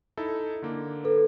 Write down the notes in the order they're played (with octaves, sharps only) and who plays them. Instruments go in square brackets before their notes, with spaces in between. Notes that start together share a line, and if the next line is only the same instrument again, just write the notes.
[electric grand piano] D#4 E4 A4
D3 A#3
[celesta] A4 B4